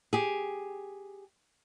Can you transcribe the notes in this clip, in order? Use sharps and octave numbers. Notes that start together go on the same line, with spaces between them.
G4 G#4